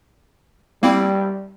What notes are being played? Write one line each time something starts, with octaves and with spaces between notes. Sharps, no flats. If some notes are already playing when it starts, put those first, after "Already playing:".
G3 A#3 C4 E4